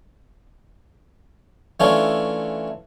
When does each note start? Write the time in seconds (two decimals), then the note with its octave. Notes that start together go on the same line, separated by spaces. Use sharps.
1.80 E3 A3 C#4 D4 F4 C#5